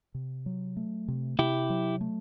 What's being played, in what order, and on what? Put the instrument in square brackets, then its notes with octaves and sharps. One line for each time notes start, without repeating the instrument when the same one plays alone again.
[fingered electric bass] C3
F#3
A3
C3
[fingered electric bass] C3 [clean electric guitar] E4 G4
[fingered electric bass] F#3
A3